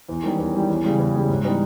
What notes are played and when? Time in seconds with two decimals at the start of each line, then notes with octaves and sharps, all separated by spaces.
0.08 E2
0.24 D#3 G3 C#4
0.38 E2
0.54 D#3 G3 C#4
0.69 E2
0.84 C#3 G3 C#4 G#4
0.99 E2
1.14 C#3 G3 C#4 G#4
1.29 G#2
1.44 E3 G3 B3 D#4